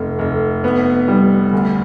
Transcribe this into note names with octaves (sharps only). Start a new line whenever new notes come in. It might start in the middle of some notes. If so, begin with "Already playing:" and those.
Already playing: F1
F1
B3
G3
D2